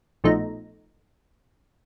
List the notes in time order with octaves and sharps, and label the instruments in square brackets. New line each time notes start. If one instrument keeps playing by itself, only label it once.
[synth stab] A#1 B2 F3 A3 D#4 A#5